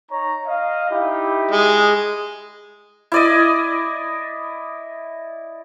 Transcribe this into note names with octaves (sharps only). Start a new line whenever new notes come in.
D#4 C#5 A#5
D#5 F5
D#4 E4 G4
G#3
E4 D5 D#5